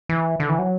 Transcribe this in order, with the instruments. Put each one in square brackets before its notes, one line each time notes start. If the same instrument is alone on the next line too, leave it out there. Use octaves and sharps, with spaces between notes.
[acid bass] E3
D3
E3
F#3